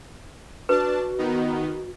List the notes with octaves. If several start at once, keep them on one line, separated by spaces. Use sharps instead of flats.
D4 F#4 B4 A5
D#3 B3 D#4